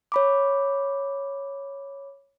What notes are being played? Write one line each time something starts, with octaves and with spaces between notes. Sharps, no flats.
C#5 B5 D6